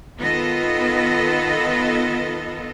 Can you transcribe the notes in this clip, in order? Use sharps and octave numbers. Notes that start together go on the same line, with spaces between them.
D#3 B3 F4 A4 D#5